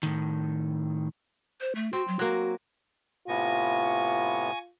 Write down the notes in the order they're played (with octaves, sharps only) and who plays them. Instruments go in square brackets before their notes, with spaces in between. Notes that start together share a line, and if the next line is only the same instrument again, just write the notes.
[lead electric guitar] A2 D#3
[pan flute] C5
A3
[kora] C4 [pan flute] F#4
[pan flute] F#3
[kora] F#3 A#3 [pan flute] F#4
[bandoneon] A2 C3 B3 [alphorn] F4 [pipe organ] G#5 C#6 A#6